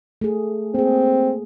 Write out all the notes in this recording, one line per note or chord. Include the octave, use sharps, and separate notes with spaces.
A3 G#4
A#3 C4 G#4